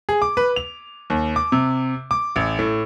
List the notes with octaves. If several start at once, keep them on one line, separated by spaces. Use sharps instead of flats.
G#4
D6
B4
F7
D#2
D6
C3
D6
A1
A2